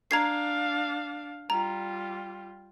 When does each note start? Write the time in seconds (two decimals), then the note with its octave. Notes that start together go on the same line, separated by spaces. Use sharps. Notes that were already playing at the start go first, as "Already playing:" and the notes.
0.11 D4 F5 A#5 G#6 C7
1.50 G3 F4 A#5